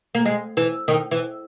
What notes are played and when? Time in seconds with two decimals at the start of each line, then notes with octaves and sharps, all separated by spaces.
0.15 A#3
0.26 G#3
0.57 E3
0.88 D#3
1.11 E3